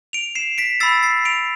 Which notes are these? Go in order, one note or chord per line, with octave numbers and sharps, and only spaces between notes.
D7 F7
C7 E7
B6 D7
B5 E6 A6 C7
A6 C7
D7 F7